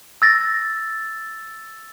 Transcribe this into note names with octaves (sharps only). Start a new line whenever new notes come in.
E6 A6 A#6